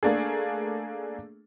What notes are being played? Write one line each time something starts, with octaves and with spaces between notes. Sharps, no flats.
A3 A#3 D4 G#4